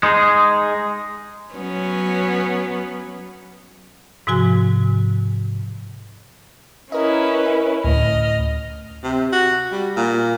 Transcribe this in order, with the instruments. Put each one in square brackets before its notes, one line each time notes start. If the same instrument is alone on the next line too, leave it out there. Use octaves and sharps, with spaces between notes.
[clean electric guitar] G#3 D#4 G#4
[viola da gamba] F#3 B3 C#4
[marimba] G#2 C3 F3 F#4 G#5
[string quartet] C#4 E4 B4 [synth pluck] A#4 D#5
[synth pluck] D2 A2 [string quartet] D#5 F6
[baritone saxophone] C3
F#4
G3
A#2